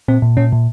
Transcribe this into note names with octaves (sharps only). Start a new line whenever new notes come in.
A#2 C4
A#2
A#2 C#4
A#2